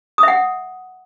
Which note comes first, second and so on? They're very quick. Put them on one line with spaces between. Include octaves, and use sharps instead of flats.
D#6 E5 F#5